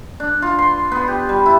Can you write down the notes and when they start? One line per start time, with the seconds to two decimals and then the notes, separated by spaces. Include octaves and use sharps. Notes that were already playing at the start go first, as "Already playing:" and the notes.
0.20 D4
0.42 F4
0.59 C6
0.92 B3
1.08 G4
1.29 G3
1.46 E4